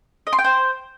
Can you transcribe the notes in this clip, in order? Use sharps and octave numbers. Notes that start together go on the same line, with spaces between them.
D#5
C6
G5
C5